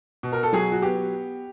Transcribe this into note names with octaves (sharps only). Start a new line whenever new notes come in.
B2
A#4
A4
F#3 G#4
F#4
B3 G4